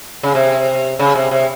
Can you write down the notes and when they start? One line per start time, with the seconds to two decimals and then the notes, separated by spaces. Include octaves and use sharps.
0.23 C#3
0.35 C3
0.99 C#3
1.15 C3
1.31 C3